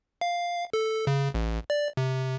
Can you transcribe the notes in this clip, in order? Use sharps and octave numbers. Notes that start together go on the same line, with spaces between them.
F5
A4
C#3
A1
D5
C3